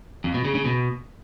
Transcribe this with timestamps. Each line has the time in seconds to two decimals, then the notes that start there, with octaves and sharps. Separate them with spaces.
0.24 F2
0.34 B2
0.45 C#3
0.55 C#3
0.65 B2